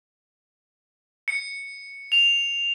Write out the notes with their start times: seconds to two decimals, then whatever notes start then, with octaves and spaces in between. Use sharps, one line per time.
1.28 C#7
2.12 F7